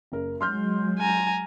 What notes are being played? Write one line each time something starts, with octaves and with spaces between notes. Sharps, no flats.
F#1 A#4
F#3 G#3 C6 F6 G6
G#5 A#5